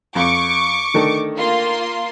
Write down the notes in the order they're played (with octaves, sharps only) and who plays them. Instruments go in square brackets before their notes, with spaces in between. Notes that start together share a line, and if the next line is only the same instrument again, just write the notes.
[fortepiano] F2 [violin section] C#6 D6
[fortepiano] D3 D#3 A3
[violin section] A#3 F4 C6